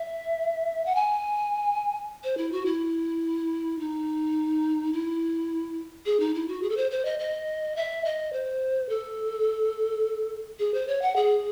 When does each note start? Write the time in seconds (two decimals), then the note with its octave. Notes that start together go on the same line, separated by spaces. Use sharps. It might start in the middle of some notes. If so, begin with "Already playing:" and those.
Already playing: E5
0.85 F#5
0.95 G#5
2.23 C5
2.37 E4
2.52 F#4
2.65 E4
3.79 D#4
4.93 E4
6.05 G#4
6.19 D#4
6.34 E4
6.48 F#4
6.62 G#4
6.69 A4
6.77 C5
6.91 C5
7.05 D#5
7.19 D#5
7.76 E5
8.04 D#5
8.32 C5
8.89 A4
10.59 G#4
10.74 C5
10.87 C#5
11.01 F#5
11.16 G#4